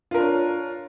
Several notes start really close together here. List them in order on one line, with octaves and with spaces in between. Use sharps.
F4 A#4 D4 C#5